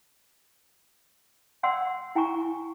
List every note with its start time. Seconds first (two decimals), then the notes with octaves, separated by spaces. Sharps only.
1.63 D5 F#5 G5 C6 E6
2.15 E4 G5 G#5 A#5 C#6